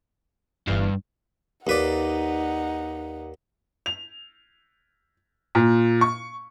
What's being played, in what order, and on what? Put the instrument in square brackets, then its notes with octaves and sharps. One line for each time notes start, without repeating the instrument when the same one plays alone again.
[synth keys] G1 E3 F5 [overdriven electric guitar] G2
[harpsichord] D#2 B4 D5 [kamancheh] D#4 F#5
[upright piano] F7
A#2
C#6